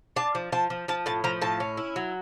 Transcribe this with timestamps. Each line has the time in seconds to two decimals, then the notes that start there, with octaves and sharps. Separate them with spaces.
0.16 D4 A5
0.35 F3
0.52 F3 A5
0.70 F3
0.88 F3 A5
1.06 A2 A5
1.24 F3 A#5
1.42 A2 A5
1.60 C#4
1.77 E4
1.96 F#3